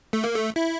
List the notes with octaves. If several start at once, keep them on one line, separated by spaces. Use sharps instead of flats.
A3
A#3
A3
E4